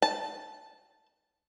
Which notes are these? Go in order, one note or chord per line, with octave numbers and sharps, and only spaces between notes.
A5